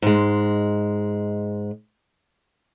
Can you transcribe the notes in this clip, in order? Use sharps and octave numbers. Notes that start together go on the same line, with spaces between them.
G#2 G#3